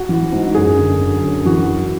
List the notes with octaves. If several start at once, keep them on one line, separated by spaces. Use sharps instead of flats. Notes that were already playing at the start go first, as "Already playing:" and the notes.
Already playing: F#4
E3
G#2
F#2 G#4
D3
D3
F#2
E3 F#4